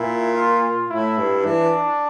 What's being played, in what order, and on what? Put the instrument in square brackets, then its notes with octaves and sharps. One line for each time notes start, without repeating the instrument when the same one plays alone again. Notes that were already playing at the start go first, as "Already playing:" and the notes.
Already playing: [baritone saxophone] A#2 [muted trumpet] E4
[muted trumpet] F4
[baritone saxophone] A2 [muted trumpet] E4
[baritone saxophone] G2
[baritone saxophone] E3 [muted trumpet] D4